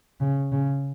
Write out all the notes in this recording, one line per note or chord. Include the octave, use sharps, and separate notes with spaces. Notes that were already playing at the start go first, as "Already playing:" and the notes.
C#3
C#3